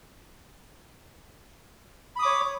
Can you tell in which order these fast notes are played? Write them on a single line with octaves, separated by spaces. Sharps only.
B5 D#6 D6 C#5